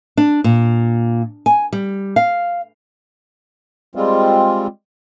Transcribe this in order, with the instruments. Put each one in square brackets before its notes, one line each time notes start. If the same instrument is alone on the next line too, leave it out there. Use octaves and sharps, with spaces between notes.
[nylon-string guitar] D4
A#2
G#5
G3
F5
[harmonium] G3 G#3 C4 F4